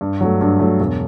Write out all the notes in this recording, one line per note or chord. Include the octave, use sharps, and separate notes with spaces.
G2
F#3 A3
G2
F#3 A3
E1